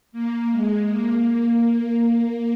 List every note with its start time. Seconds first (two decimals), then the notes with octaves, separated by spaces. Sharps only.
0.12 A#3
0.51 G#3
0.88 A#3